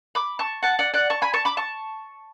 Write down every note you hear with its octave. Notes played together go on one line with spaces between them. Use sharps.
B5 D6
A5 C#6
F#5 A5
D5 F#5
D5 F#5
A5 C#6
G#5 B5
A5 C#6
B5 D6
A5 C#6